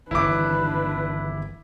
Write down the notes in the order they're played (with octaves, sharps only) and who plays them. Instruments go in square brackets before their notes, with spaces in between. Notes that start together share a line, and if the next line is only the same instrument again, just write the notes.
[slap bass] G1 D#3 E3 [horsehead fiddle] D4 B4 [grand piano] E4 D6